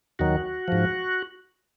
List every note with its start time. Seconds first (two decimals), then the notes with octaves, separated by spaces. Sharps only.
0.19 D#2 D#3 F#3 F#4
0.68 G#2 F3